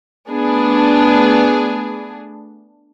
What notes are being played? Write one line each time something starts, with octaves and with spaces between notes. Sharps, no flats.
A3 B3 D4 G#4